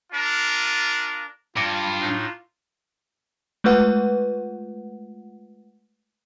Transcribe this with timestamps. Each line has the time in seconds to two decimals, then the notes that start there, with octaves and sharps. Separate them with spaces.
0.12 D4 F4 A#4
1.57 G2 F4 D6 G#6 A#6 C#7
1.99 A2 D4 D#4
3.64 G#3 A3 F4 B4 F#5